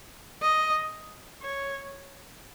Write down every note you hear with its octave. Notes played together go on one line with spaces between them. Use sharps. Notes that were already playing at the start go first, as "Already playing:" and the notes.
D#5
C#5